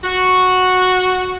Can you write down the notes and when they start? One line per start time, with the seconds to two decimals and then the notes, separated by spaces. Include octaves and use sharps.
0.04 F#4